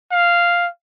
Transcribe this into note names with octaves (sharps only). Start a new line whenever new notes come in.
F5